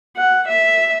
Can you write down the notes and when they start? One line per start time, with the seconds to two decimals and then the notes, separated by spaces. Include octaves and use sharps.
0.16 F#5
0.48 E5